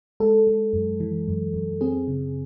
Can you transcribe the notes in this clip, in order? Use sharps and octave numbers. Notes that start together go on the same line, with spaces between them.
G#3 A4
G#3
F#2
E3
F#2
F#2
C4 G#4
C#3